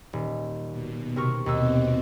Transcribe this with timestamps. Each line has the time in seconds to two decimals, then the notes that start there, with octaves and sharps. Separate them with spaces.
0.13 D#1
0.71 B2
1.16 C3 A#4 C#6
1.46 D#2 B2 C4 D#4 E6